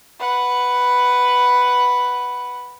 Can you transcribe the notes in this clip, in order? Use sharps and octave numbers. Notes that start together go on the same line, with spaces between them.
B4 F#5